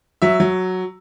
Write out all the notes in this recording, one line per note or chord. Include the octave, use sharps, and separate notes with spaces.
F#3 E5
F#3